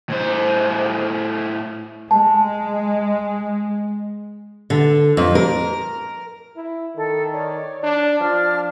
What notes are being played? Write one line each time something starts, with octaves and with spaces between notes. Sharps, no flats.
A2 C5
G#3 A5
D3
F2
A#4
E4
D#3 A4
C#5 D5
D4
F3 D4 D5 F6